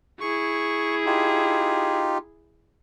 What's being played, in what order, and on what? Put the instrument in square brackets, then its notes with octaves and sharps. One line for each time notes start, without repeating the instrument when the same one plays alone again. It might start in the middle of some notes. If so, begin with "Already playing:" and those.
[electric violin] E4 G#4 [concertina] C#6
[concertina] D#4 F4 G4